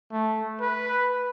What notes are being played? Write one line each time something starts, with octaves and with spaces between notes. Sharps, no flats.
A3
B4